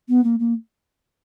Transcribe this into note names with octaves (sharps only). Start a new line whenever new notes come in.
B3
A#3
A#3